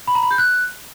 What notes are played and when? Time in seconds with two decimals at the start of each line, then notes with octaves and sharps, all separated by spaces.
0.07 B5
0.15 A#5
0.23 B5
0.31 G6
0.38 F#6